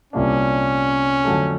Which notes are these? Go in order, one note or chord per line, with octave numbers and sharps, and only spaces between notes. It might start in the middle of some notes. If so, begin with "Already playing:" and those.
C2 A#2 G3 A#3 C#4 D4
F2 D3 F#3 A3